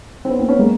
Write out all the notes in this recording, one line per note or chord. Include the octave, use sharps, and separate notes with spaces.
C4
B3 C#4
A#3 C4
B3 C#4
G#3 A#3